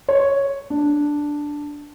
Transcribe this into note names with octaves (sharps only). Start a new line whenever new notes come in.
C#5
D4